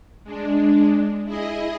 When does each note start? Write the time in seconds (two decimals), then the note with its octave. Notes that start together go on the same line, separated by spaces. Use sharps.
0.24 G#3 D4
1.25 E4 G#4 D#5